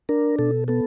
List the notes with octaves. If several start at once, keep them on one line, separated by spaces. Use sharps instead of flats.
D4 A#4
B2 A4
B3 A4